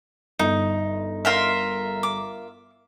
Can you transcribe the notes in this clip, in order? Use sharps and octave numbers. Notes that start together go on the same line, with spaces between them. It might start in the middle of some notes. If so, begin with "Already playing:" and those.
G1 D#4
F4 A#4 E5
D6